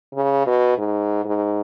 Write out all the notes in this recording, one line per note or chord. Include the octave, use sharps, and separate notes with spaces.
C#3
B2
G#2
G#2